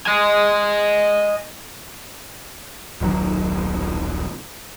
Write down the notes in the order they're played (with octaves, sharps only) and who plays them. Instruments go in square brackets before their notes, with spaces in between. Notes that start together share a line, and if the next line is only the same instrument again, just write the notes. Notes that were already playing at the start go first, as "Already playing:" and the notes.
[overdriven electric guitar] D#5 G#5
[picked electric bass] D#1 B1 D#3 F#3